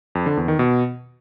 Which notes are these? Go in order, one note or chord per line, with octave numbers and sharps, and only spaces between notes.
F2
D3
E2
D#3
B2